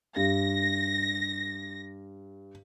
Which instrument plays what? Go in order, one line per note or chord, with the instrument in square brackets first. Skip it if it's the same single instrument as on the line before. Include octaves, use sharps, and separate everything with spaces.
[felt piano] G2 [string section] A#6